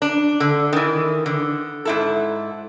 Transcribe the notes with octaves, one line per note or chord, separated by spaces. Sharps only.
D4
D3
D#3 E3
D3
G#2 E4 A4